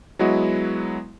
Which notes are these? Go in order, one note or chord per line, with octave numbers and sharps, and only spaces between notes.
F#3 G#3 B3 E4 F#4 D#5